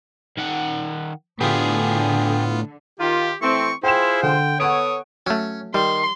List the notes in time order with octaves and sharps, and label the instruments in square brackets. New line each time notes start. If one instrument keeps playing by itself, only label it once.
[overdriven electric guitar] D#3 F#5
[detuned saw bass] A2 [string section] D3 [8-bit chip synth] B3 F4 [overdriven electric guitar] G4 G#4
[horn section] D#3 F4 [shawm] G4
[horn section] E3 A3 C4 [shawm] C#6
[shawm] E4 [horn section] F4 G#4 C5 [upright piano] G5 E7
[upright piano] D3 [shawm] G5
[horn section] B3 A4 C#5 [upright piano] F#5 D7 [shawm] D#6
[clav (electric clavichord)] F#3 A3 [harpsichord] C#4
[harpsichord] D#3 [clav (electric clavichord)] G3 [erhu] C6